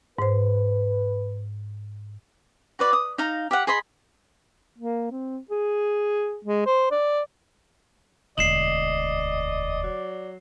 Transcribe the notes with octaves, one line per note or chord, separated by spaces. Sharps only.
G#2 B4 C5
F#4 B4 D5
D#6
D#4 F5 A#5
G4 F5 F#5
G#4 D#5 B5 C6
A#3
C4
G#4
G#3
C5
D5
E1 D2 D5 D#5 C7 E7 F#7
F#3